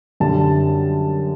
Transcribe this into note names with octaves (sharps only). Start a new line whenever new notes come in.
F#2 D3 G3 A5